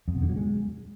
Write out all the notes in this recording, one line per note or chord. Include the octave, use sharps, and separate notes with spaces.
F2
B2
D3
F#3
G#3